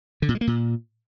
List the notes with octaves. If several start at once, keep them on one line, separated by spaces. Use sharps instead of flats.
D3
A#2
G#3
A#3
A#2